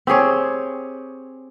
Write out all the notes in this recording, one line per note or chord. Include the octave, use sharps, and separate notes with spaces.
C4 G4 G#4 C#5